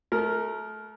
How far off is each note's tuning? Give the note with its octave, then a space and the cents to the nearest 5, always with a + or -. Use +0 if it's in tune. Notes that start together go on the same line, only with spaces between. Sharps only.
A3 -35 A#4 +0